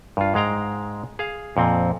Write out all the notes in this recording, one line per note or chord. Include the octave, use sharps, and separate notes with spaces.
G2 F4
G#2 G#3 F5 G5 A#5
G#4 F5
F2 A#2 C4